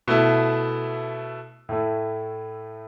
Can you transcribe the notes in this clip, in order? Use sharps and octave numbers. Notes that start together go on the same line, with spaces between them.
B2 A3 E4
A2 A3 E4